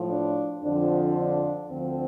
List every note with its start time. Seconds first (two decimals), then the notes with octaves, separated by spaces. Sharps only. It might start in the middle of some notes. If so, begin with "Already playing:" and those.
Already playing: A2 F3
0.10 D4
0.63 F2 D3 F3 D4
1.17 D4
1.70 D2 D3 F3 C4